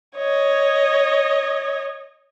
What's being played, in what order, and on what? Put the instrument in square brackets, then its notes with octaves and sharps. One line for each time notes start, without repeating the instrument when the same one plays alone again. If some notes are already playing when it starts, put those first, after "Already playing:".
[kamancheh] C#5 D#5